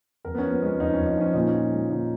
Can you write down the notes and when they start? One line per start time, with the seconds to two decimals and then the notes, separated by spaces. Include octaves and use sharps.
0.25 F2 A#4
0.35 B3
0.38 C#4
0.44 F3
0.52 B3
0.62 G#3 C#4
0.80 F2 D#4
0.93 C#4
0.99 F2
1.06 D#4
1.17 F3 C#4
1.33 A#2 D#4
1.47 C#4
1.54 F3
1.72 G#3
1.90 A#2 D#4